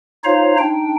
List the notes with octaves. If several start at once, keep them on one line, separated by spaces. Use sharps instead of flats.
D#4 F4 C5 C#5 F5 A#5
D4 D#4 G5